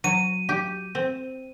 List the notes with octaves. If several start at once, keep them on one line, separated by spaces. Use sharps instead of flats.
F#3 D#7
G4
C4